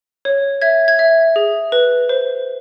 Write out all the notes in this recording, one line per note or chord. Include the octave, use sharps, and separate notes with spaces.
C#5
E5 G#6
G#6
E5
G#4
B4
C5